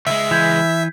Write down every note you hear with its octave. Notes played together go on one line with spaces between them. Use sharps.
C#2 G#3 E5
E3 G6 G#6 B6